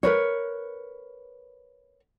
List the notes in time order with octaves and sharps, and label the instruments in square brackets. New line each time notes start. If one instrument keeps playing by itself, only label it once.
[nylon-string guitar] A#4 B4 C#5